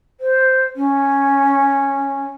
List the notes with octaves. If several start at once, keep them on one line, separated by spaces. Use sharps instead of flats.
C5
C#4